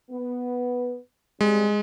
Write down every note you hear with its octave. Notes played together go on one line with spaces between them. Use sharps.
B3
G3 G#3 C4